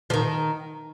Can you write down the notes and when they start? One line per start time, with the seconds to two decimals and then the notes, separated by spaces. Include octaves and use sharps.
0.10 F3
0.14 D#3